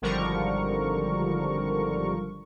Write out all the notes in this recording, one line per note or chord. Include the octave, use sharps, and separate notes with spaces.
G#1 D3 F3 G3 A#4 C#6